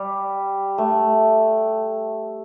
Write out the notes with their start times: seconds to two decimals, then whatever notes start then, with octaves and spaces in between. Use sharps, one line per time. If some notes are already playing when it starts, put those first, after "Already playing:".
Already playing: G3
0.78 A3